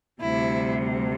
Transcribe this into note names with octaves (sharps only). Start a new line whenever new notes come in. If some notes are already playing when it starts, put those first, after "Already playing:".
D2 C3 G3 E4